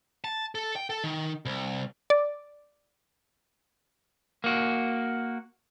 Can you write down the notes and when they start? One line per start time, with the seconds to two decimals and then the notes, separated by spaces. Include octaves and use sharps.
0.24 A5
0.55 A4
0.76 G5
0.90 A4
1.04 D#3
1.45 C2
2.10 D5
4.44 A#3 F#4